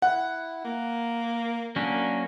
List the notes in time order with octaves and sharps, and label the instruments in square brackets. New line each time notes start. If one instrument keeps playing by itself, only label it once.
[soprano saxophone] E4 [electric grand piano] F#5
[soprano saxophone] A#3
[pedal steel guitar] F#3 A#3 C#4 [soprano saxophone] D4